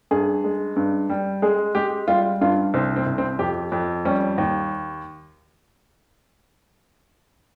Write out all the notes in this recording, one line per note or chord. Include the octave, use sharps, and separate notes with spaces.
G2 G#4
G#3
G2
G3
G#3 G#4
G#3 G4
G3 F4
G2 F4
C2 C4
C4
C2
C4
F2 G4
F2
G3 C#4
D#2